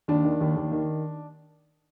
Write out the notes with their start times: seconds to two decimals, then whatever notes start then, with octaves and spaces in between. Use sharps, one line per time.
0.08 D#2 D4
0.24 D#3
0.41 D#2
0.56 D#2
0.72 D#3